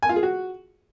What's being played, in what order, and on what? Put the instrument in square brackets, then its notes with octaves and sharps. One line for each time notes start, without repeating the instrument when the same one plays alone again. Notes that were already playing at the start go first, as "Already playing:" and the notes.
[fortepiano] G#5
F4
G#4
F#4